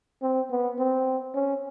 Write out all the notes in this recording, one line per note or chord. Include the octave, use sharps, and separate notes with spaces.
C4
B3
C4
C#4